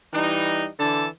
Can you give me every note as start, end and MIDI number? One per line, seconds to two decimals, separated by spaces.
0.13 0.66 52
0.13 0.66 55
0.13 0.66 63
0.78 1.07 50
0.78 1.07 52
0.78 1.07 69
0.78 1.07 81